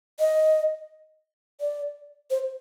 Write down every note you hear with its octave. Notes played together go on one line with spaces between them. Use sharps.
D#5
D5
C5